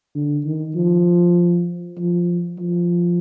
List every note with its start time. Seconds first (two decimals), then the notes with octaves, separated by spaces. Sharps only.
0.15 D3
0.45 D#3
0.76 F3
1.98 F3
2.59 F3